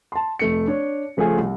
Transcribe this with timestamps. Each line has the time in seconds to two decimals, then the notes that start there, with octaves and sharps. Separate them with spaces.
0.12 A5 C6
0.39 F1 A3 C#7
0.67 D4 C#5
1.17 C#3 F3 A3 F4 G#4 A4
1.38 C2